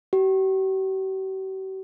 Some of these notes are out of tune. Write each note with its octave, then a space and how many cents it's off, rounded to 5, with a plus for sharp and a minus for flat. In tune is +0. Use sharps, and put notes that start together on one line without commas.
G4 -45